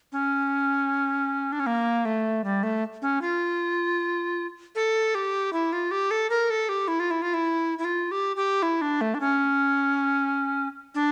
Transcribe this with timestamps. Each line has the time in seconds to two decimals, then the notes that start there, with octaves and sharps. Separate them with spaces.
0.12 C#4
1.52 D4
1.60 C#4
1.66 A#3
2.05 A3
2.44 G3
2.63 A3
3.02 C#4
3.21 F4
4.75 A4
5.15 G4
5.53 E4
5.72 F4
5.91 G4
6.11 A4
6.30 A#4
6.50 A4
6.69 G4
6.88 E4
7.00 F4
7.11 E4
7.22 F4
7.34 E4
7.78 E4
7.84 F4
8.11 G4
8.36 G4
8.62 E4
8.81 D4
9.01 A3
9.14 D4
9.20 C#4
10.95 D4